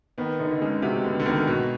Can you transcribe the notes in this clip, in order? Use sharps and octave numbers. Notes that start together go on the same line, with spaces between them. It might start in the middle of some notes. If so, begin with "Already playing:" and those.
D#3 B3
D3 D#4
D3
C#3 G#3
C3 F#4
D3 B3
D3
D#3 B3
B2 F#4